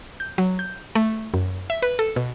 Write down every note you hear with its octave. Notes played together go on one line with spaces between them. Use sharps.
G6
F#3
G6
A3
F#2
E5
B4
A4
B2